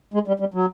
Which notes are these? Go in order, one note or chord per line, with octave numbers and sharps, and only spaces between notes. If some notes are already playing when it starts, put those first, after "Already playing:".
G#3
G3
G3
F#3